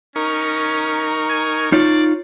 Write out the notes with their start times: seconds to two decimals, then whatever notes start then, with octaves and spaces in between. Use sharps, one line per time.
0.16 C#4 D#4 A#4 C#6
1.30 G#5
1.72 D#4 F4 C#5 D5